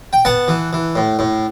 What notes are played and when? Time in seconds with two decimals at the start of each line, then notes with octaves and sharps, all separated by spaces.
0.13 G5
0.25 B3 F#5 A5
0.48 E3
0.73 E3
0.95 A2
1.19 A2